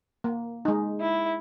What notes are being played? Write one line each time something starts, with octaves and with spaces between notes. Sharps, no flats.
A#3
G#3 D#4
E4